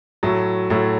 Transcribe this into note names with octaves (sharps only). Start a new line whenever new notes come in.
A2 F#3 A3
A2 F#3 A3